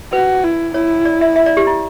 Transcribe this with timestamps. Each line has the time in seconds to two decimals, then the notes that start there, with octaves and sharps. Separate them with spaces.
0.13 F#4 B4
0.44 E4
0.74 E4 C#5
1.05 D5
1.21 E5
1.36 E5
1.46 D5
1.57 G4
1.67 E4